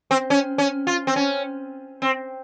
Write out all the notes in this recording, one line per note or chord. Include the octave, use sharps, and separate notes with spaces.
C4
C#4
C#4
F4
C4
C#4
C4